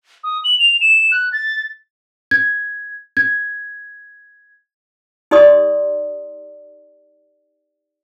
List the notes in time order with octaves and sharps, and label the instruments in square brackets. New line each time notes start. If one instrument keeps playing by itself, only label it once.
[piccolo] D#6
F#7
F7
E7
F#6
A6
[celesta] G#6
G#6
[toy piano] D#4 G4 D5 C6 D#6